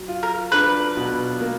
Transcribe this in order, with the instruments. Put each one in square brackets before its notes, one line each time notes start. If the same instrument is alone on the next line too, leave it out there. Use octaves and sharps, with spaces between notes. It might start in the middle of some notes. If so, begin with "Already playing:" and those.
Already playing: [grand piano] F#3
F4
[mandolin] A#4
[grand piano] D4 [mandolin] B4
[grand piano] B2
A#3